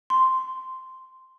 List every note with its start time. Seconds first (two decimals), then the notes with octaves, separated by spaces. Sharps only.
0.10 C6